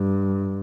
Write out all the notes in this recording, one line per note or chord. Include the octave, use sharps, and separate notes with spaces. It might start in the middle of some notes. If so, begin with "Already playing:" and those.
Already playing: G2